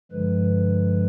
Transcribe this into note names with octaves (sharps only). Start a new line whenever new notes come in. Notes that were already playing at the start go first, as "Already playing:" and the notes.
G2 D3 F3 G#3 B4